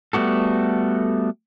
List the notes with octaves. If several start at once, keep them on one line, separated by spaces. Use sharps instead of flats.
G3 A3 B3 F#4 A4